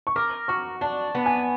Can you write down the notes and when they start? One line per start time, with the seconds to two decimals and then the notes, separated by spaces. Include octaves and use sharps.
0.07 C#6
0.16 A#4 D6
0.48 F#4 C#6
0.81 D4 A5
1.15 B3
1.26 G#5